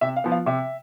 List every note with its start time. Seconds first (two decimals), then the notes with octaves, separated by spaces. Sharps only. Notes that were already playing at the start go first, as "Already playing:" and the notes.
0.01 C3 E5
0.16 F5
0.24 F3 B3
0.32 F5
0.46 C3 E5